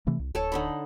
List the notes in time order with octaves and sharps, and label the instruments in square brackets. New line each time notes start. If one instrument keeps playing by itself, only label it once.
[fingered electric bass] C3 E3 A3
C2
[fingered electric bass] D1 [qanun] A4 C#5 A5
[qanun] D3 D#4 B5